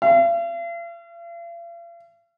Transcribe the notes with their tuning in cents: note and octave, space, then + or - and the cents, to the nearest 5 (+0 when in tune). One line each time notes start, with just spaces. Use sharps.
F5 -45